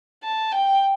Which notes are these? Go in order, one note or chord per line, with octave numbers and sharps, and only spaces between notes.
A5
G5